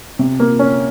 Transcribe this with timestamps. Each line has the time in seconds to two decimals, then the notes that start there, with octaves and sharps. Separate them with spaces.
0.19 C3
0.40 A#3
0.59 C#4